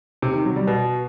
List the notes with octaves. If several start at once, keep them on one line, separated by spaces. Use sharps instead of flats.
C3
D#3
F#3
G3
B2